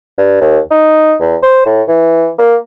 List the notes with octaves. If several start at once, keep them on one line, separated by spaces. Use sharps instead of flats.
G2
D#2
D#4
E2
C5
A2
E3
A#3